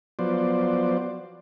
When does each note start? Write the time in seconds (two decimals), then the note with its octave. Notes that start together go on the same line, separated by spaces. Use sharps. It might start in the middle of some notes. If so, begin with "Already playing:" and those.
0.19 F3 F#3 B3 C5 D5